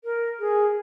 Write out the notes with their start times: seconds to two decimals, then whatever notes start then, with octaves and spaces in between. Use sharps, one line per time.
0.04 A#4
0.39 G#4